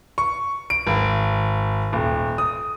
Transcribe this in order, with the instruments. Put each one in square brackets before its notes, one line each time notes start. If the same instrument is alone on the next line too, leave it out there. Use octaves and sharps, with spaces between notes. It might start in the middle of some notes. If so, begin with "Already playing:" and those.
[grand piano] C#6
D7
G#1
D#1
D#6